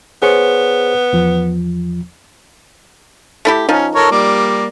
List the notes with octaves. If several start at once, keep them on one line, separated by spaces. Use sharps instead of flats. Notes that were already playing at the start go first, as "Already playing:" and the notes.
B3 G#4 C5 C#5
E2 F3
A3 E4 G4
F3 C#4 D#4
A4 A#4 C#5
G3 A#3 D5